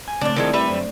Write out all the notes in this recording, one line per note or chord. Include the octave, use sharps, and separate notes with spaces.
G#5
D2 C#3 A3 C4 D4 D5
D#3 F3 G#3 C4 E4 A#4
G3 B4 E5
F#2 A3 C4